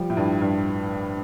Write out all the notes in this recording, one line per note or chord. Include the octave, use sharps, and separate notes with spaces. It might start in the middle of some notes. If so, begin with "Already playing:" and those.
Already playing: F3 G3
A2
G2
G2